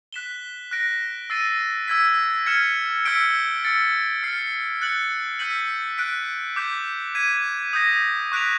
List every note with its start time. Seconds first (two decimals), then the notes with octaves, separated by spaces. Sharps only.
0.13 F#6 B6 E7 G7
0.71 F#6 A#6 D7
1.30 E6 A6 C7 D#7
1.88 E6 G#6 B6
2.46 F6 G#6 C#7 E7
3.05 E6 G6 B6 D7 G7
3.64 E6 A6 C#7
4.23 F6 A6 C7
4.81 F#6 A6 C#7 F#7
5.39 E6 G6 B6 D#7 F#7
5.98 F#6 B6 D7
6.56 D6 G6 B6 E7
7.15 G#6 B6 D#7
7.73 D#6 G6 A#6
8.32 C#6 F#6 B6 D7 F7